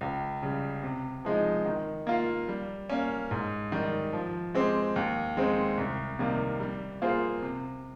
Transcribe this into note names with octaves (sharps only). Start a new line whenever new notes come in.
C#2
C#3 G3
C3
F3 G#3 D#4
D#3
A#3 F4
G3
A#3 C#4
G#2
D#3 G3
F3
G#3 C4 G4
D#2
D#3 G#3 C4
C2
C3 D#3 G3 A#3
G3
A#3 F4 G#4 C5
C3